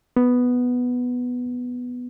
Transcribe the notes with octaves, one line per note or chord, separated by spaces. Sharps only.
B3